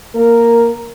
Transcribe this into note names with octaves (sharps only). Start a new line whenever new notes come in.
A#3 A#4